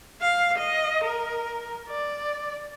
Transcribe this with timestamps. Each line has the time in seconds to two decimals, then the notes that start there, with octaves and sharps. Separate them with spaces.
0.21 F5
0.58 D#5
1.04 A#4
1.89 D5